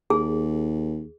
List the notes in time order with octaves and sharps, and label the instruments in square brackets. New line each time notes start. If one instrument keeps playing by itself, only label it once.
[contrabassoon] D#2 [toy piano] G#4